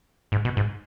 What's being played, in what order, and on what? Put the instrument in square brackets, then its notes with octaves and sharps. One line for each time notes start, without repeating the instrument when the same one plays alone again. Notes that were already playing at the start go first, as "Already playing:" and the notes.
[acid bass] G#2
B2
G#2